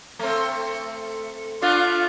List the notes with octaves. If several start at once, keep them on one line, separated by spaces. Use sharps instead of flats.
A3 C4
A3 D4 F4